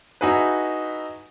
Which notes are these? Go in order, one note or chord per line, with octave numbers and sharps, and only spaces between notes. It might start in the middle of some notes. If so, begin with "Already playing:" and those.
D#4 E4 F#4 G#4 B4